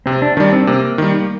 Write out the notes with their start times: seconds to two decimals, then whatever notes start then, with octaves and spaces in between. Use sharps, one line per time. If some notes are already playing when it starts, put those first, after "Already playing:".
0.06 C3 C4
0.22 D4
0.37 D#3 G3 D4
0.53 C4
0.67 C3 A#3
0.98 D#3 G3